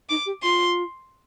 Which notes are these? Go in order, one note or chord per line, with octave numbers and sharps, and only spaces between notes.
D#4 D6
G4
F4 C6